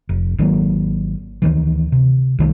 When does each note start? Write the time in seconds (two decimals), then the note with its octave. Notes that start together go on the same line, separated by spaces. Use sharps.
0.09 F1
0.38 G#1 D#3 F#3 A#3
1.42 D2 D#3 E3
1.92 C3
2.39 C2 D#3 E3 A3